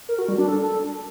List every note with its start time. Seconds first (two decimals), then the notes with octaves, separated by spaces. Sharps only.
0.09 A#4
0.19 F#4
0.28 G3
0.38 D4
0.48 A4